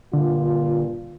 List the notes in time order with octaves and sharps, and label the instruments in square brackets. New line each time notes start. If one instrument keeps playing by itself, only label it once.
[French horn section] G2 A#2 F4 [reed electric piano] D3